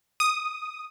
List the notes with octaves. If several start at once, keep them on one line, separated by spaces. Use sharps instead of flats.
D#6